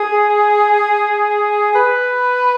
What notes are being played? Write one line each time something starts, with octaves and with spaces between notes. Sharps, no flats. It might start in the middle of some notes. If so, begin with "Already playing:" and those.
Already playing: G#4
B4